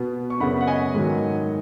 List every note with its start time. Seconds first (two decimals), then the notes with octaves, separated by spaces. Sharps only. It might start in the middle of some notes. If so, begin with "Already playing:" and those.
Already playing: B2 B3
0.30 C#6
0.40 F#2 C#3 B3 F#5 B5
0.61 F#5
0.67 D#5 G#5
0.94 G#2 D#3 F#3